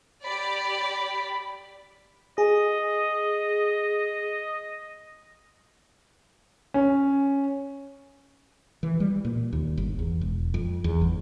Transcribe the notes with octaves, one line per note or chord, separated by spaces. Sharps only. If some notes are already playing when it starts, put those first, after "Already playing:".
G4 D5 B5
G#4 D#5
C#4
E3
G3
A#2
D#2
G1
E2
E1
F2
E2
G1